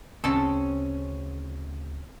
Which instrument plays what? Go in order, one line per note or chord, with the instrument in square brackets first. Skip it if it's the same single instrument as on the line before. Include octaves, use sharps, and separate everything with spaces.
[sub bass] D2 [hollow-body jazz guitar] C#3 C4 C#4 [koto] A4 A5